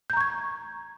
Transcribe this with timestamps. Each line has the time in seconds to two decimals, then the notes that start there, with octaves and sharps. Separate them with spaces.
0.10 G6
0.13 A#5
0.17 C#6
0.21 G#6